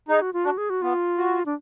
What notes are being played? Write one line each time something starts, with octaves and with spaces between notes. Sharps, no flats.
D#4 G#4
F#4
F4
D4 F#4
G#4
F#4
B3 F4
F#4
D4